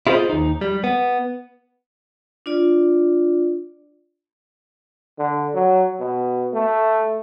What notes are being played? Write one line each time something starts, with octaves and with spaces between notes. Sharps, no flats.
E4 F4 G#4 A#4 C5 D#5
D#2 D#4
G3
B3
D4 F4 D5
D3
F#3
B2
A3